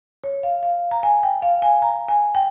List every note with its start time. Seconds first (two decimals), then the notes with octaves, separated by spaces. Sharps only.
0.24 C#5
0.43 F5
0.63 F5
0.91 A#5
1.03 G#5
1.23 G5
1.42 F5
1.62 G#5
1.82 A#5
2.08 G#5
2.35 G5